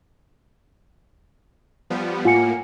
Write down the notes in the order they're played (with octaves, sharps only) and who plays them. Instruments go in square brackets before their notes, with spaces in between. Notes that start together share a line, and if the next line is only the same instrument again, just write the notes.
[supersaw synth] F3 G3 B3
[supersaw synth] A2 A#3 [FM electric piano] F4 [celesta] F#5 G#5 C#7